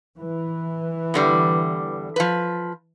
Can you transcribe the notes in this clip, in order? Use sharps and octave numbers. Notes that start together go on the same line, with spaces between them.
E3
E2 D3 G3
F3 B4